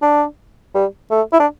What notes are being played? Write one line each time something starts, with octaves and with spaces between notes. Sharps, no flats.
D4
G3
A3
E4
D4